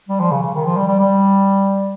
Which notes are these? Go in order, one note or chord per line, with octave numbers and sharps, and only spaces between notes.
G3
F3
C#3
C#3
D#3
F3
G3
G3
G3